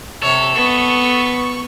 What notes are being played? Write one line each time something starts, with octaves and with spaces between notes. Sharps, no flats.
C3 A4 C#5
B3 C#6